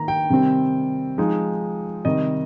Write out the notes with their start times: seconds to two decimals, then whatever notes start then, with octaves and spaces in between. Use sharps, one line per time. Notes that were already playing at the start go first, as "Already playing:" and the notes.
Already playing: D#3 A#3 A#5
0.08 G5
0.30 C3 D#3 G3 C4
1.18 F3 G#3 D#4
2.05 C3 D#3 G3 D#5